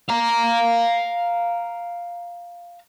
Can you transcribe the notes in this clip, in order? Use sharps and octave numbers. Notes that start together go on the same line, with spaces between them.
F5 A#5